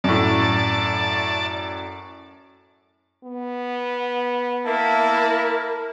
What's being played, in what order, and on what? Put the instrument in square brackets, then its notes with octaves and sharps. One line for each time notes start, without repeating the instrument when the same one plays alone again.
[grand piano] F#2 A2 [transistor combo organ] D5 A5
[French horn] B3
[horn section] A#3 E4 [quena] A#4 [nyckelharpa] A5